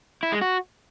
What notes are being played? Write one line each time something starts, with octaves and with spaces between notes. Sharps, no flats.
E4
G#3
F#4